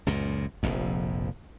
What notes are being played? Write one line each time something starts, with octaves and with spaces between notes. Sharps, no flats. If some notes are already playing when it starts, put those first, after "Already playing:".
C#2 F#2 A#2
F1 A#1 F2